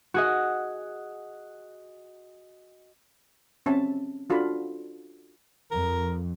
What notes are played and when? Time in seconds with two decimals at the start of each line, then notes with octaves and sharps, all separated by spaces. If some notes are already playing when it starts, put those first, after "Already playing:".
0.14 F#4 G#4 D#5
3.66 C4 C#4 E5 A5
4.30 D4 F4 F#4 A4 B5
5.71 F2 F3 A#4